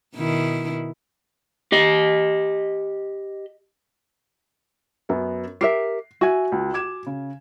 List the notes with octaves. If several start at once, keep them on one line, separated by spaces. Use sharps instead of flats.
B2 D#3 E4
G4 D#5
F#2 B3
G4 A#4 E5 C7
F#4 E5 G#5 G#6
C#2
D6 G#6 E7
C#3